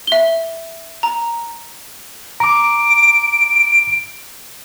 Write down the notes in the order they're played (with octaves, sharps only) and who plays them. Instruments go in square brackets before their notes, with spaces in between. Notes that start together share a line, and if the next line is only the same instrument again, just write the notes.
[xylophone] E5 G7
A#5
[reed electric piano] A#5 D6 [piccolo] D7